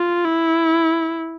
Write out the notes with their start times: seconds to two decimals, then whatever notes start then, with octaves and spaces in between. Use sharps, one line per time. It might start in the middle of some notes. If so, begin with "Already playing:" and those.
Already playing: F4
0.25 E4